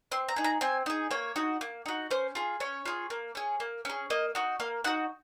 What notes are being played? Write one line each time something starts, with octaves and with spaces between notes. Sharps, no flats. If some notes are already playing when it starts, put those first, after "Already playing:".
C4 C6
A#5
D#4 G#4
A#5
C4 G#5
D#4 G#4
A#3 C#5
D#4 F#4
A#3
D#4 F#4
C#4 C5
F4 G#4
C#4 C#5
F4 G#4
A#3
C#4 G#4
A#3
C#4 G#4
A#3 D#5
D#4 F#4
A#3 F5
D#4 F#4 F#5